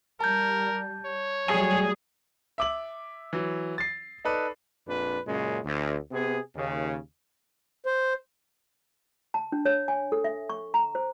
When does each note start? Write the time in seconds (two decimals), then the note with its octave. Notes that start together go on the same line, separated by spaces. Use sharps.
0.20 G3 A#4 A5 G6
1.05 C#5
1.50 F#3 G3 A3 G#4 G#5
2.58 E5 D6 F#7
3.33 E3 F#3
3.78 A6 C7
4.25 D#4 A4 B4 D5
4.87 A#1 F2 D4 B4
5.26 F#2 A#2 C#3 G#3
5.65 D2
6.12 C3 B3 G#4
6.55 D#2 C#3
7.86 C5
9.34 A5
9.52 D4
9.65 C#5
9.88 G#5
10.12 A4
10.24 E5
10.49 C#6
10.74 A#5
10.95 C5